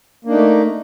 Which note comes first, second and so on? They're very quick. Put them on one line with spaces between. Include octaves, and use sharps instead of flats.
A#3 D4 D#4 A3